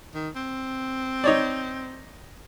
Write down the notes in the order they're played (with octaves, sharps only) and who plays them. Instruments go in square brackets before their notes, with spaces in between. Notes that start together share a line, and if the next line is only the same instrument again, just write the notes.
[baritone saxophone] D#3
C4
[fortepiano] D#4 C#5 D5